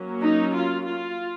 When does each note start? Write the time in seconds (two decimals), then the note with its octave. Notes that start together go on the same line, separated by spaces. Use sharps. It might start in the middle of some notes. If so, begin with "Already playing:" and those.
Already playing: F#3 A#3 C#4
0.20 D#4
0.53 F4
0.85 F4